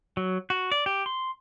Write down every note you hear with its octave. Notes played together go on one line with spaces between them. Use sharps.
F#3
F#4
D5
G4
C6